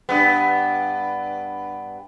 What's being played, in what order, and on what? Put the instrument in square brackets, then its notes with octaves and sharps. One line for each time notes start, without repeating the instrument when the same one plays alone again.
[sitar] G2 B3